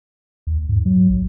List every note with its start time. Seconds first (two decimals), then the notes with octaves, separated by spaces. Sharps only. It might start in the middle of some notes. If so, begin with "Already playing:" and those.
0.47 D#2
0.69 G#2
0.85 F#3
1.10 A#1